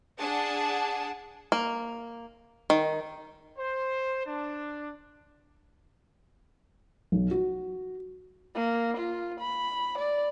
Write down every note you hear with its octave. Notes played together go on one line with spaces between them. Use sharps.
D4 G#4 F#5 A5
A#3
D#3
C5
D4
B1
F#4
A#3
F4
B5
D5